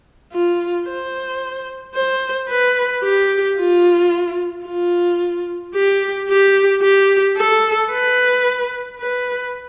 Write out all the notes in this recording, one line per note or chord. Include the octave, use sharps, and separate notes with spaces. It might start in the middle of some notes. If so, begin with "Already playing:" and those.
F4
C5
C5
B4
G4
F4
F4
G4
G4
G4
A4
B4
B4